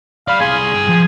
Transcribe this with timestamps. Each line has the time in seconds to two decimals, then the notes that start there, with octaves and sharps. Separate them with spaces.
0.28 D5 F5 B5
0.41 C2 G#4 C6
0.75 G2 G5
0.90 F3